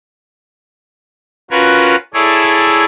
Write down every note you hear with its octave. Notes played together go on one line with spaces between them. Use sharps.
C#4 F4 F#4 A#4 B4 C#5
E4 G#4 A4 C#5 D5